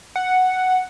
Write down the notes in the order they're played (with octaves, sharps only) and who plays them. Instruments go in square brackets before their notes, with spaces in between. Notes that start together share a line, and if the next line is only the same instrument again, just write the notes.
[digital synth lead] F#5